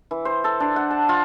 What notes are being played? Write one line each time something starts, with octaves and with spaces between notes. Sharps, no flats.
E3
C5
A4
D4
F#5
A5
F4